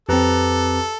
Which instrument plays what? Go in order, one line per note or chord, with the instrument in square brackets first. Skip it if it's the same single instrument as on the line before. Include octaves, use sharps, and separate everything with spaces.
[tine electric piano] F2 C4 [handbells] G4 B4 A#5 [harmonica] A4